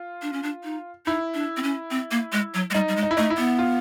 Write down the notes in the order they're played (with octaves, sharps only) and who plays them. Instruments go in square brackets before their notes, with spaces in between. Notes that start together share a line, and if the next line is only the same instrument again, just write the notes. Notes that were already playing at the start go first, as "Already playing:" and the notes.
Already playing: [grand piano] F4
[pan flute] D4
C#4
D4
D#4
[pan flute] D#4 [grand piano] E4
[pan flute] D4
C4
C#4
C4
A#3
G#3
F#3
G#3
[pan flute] G3 [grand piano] D#4
[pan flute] G3
G#3
[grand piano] D#4
E4
[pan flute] A3 [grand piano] D#4
[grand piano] E4
[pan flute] B3
[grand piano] F4